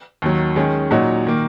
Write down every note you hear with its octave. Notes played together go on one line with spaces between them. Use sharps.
D#2 D#3 F#3
D#3 G#3 C#4 G#4
A#2 F#3 D#4 F#4 C#5
D#3 A#3